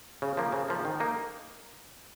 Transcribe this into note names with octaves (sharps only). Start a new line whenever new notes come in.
C#3
F3 A#3
C#3
F3 A#3
D#3
A#3 D#4